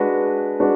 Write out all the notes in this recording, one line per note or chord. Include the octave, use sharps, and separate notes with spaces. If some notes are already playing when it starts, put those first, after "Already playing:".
Already playing: G#3 D4 F#4 B4
G#3 D4 F#4 B4